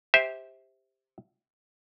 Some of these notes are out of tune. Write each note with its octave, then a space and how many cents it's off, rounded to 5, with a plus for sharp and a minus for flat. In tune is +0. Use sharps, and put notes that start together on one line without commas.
G4 +10 C5 +0 E5 -20